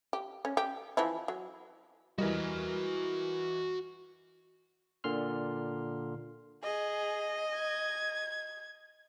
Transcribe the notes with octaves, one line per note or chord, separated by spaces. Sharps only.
G4
C#4
G4
E3 F3 E4
F#3
E3 G3 F#4 A#4 D#5 E5
A#2 D3 C6 F6
G#4 D#5
G#6